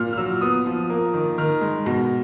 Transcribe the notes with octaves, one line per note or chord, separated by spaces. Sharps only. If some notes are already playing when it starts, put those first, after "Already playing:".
Already playing: A#2 F6
F6
F#3 E6
B3 D#6
F3
A#3
D#3
D#3 F6
G#3
B2